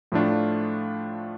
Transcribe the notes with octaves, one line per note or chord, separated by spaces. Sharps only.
A2 F3 A3 D4 F4